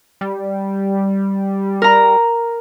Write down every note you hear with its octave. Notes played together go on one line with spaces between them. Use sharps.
G3
A#4 A#5